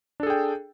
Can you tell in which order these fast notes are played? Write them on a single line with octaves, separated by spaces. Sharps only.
D4 A4 G#4 G5